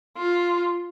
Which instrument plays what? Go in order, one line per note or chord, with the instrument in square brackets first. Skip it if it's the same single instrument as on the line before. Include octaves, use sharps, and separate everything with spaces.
[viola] F4